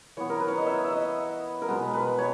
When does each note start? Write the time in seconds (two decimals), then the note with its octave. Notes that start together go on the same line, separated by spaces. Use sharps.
0.17 E3 B3 C#5
0.30 A#4
0.40 B4
0.48 C#5
0.58 D#5
0.67 E5
0.84 E5
0.92 D#5
1.62 A#4
1.68 B2 G#3 B3 B4
1.93 B4
2.18 C#5